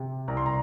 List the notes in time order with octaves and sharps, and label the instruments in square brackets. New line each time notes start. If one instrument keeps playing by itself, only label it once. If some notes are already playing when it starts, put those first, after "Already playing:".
Already playing: [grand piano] C3
C2 A#5
C6
A#5